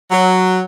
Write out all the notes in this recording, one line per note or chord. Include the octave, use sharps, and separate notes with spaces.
F#3